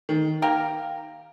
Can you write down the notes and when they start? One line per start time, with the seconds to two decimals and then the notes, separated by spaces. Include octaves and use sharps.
0.09 D#3
0.42 A#3 G4 A#4